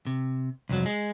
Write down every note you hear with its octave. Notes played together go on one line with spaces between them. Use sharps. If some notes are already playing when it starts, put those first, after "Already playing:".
C3
C2 F2 F#3
G#3